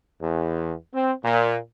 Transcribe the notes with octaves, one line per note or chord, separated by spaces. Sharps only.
E2
C4
A#2